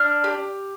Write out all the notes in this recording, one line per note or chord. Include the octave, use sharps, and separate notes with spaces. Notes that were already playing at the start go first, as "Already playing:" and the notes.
Already playing: D4 F6
G4